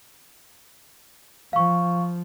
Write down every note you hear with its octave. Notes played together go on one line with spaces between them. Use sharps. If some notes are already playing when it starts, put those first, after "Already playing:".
F3 F5 C#6